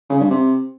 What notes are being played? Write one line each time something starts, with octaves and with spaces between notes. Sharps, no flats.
C#3
G2
C3